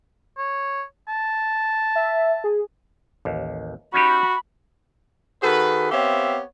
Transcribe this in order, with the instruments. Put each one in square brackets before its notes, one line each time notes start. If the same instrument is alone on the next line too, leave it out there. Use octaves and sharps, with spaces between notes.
[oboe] C#5
A5
[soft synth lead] E5
G#4
[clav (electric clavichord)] A1 D#2
[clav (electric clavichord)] C#4 D#4 G4 [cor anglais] F#4 [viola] B5
[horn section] D#3 F#4 G#4 A4 B4
B3 C4 G4 C#5 E5 F5